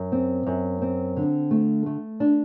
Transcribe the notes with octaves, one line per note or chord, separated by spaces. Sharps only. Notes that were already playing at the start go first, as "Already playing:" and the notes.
Already playing: F#2
C4
F#2
C4
D3
A3
A3
D4